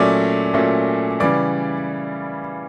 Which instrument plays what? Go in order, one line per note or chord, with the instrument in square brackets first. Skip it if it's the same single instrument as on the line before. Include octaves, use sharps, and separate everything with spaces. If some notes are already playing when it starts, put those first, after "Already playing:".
Already playing: [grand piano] A#2 F#3 A3 C#4 D5 D6
A#2 F#3 A3 C#4
C#3 E3 G3 D5 D6